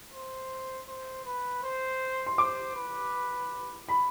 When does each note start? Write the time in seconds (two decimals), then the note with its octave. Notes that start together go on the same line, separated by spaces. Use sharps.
0.13 C5
0.88 C5
1.26 B4
1.63 C5
2.27 C6
2.38 C5 D6
2.76 B4
3.89 B5